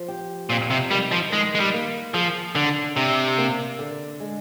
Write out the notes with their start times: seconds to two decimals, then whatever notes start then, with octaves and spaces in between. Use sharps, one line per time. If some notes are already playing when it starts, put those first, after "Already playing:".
Already playing: F3
0.08 G4
0.50 F2 A#2
0.70 C3
0.91 D#3 G3
1.12 F3
1.32 D#3 G#3
1.55 G#3
1.60 G3
1.74 A#3
2.14 F3 G#4
2.55 D3 D4
2.97 C3 D4
3.38 A#3
3.79 D3
4.20 G#3